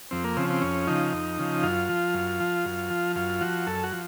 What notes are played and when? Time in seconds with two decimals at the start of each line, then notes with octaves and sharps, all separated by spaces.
0.11 F2 C4
0.24 A#3
0.37 C#3 F3 C4
0.50 C4
0.62 F2 C#4
0.87 C#3 F3 D#4
1.13 F2
1.39 C#3 F3
1.63 F#2 F4
1.89 F3
2.14 F#2
2.40 F3
2.65 F#2
2.90 F3
3.16 F#2 F4
3.41 F3 F#4
3.67 F#2 A4
3.83 F#4
3.92 F3